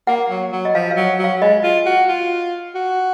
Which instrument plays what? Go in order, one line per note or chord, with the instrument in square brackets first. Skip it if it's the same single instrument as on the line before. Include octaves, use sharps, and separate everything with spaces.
[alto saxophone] A#3 [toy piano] F#5
[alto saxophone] F#3
F#3
[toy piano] D#5
[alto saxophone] F3 [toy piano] F5
[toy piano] F5
[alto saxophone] F#3
F#3
[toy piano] F5
[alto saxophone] G#3 [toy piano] D#5
[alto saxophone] F4
F#4
F4
F#4